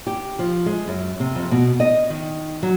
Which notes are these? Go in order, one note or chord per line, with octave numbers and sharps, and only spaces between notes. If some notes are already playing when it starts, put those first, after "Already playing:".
G4
F3
G#3
F#2
C3
F2
B2
D#5
D#3
F#3